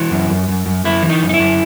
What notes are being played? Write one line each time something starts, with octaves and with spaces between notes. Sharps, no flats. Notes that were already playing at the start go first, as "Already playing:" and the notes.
Already playing: E3 F#4
F#2
F#2
F#2
F#2
F#2 E4
E3
D#4
F#2
D#4
E4
F#2